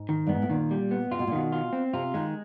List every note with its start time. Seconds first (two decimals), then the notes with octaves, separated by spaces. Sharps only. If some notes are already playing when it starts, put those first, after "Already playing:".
Already playing: G#2
0.09 D#3
0.27 G2
0.29 G#2 B3
0.42 A2
0.50 A#2 D#3
0.71 G3
0.91 B3
1.12 C3 F4
1.19 B2
1.27 A#2
1.32 B2 D#3
1.52 F4
1.73 C4
1.94 C3 F4
2.14 D#3 G#3